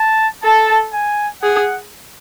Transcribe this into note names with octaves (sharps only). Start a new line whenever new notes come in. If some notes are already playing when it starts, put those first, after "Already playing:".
Already playing: A5
A4 A5
G#5
G#4 F#5